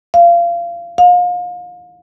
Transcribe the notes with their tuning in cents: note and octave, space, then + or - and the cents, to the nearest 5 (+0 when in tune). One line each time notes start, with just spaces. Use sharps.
F5 -25
F5 +35